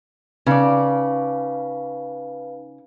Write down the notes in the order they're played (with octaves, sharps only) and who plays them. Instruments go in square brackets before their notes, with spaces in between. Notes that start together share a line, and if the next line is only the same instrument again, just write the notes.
[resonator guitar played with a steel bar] C#3 D5 [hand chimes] D#4 B4 F5